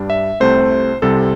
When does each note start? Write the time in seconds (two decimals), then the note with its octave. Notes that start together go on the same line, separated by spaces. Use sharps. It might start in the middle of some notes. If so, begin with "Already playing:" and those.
Already playing: G2 G3 D4
0.10 E5
0.40 C2 C3 A3 C4 C5
1.02 C2 C3 G3 C4 A4